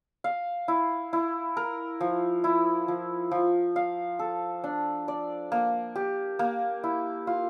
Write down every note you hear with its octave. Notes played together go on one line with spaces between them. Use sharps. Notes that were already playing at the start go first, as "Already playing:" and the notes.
F5
E4
E4
A#4
F3
E4
F3
F3
F5
A4
D4
D5
A#3
G4
A#3
E4
F4